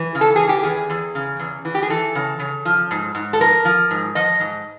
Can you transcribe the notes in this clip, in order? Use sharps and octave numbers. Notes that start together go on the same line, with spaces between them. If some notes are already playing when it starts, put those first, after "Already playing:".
Already playing: E3
C#3
A4
E3 G#4
G4
E2 G#4
E2
C#3
E2
E3
G4
G#4
E3 A4
C#3
C#3
F3
G#2
G#2
A4
F3 A#4
F3
G#2
F3 D#5
G#2